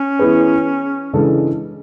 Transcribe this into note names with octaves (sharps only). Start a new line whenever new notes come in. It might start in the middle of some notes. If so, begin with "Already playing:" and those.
Already playing: C#4
E3 B3 E4 G#4 B4
C#3 E3 G#3 D4 A4